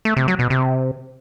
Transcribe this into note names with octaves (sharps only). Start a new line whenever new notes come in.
A3
C3
F#3
B2
C3